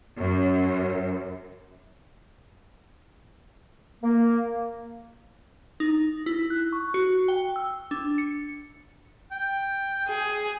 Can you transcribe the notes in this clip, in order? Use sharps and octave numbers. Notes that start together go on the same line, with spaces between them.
F#2
A#3
D#4
E4
F#6
C#6
F#4
G5
E6
D4
C#7
G5
G#4